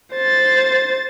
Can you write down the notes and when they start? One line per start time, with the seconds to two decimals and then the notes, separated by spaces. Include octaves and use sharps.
0.13 C5 A6